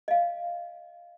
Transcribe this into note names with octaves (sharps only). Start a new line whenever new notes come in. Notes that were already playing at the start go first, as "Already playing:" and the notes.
D#5 F5